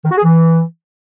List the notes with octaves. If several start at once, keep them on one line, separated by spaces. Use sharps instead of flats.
D#3
F#4
G#4
E3